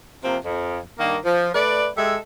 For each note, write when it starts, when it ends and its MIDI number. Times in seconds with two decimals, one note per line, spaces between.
0.23 0.37 48
0.23 0.37 53
0.23 0.37 58
0.23 0.37 60
0.44 0.79 41
0.98 1.17 43
0.98 1.17 51
0.98 1.17 58
1.24 1.51 53
1.54 1.87 57
1.54 1.87 71
1.54 1.87 74
1.97 2.16 56
1.97 2.16 67
1.97 2.16 69
1.97 2.16 76